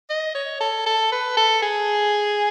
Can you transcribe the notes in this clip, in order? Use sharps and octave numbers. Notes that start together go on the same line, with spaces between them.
D#5
C#5
A4
A4
B4
A4
G#4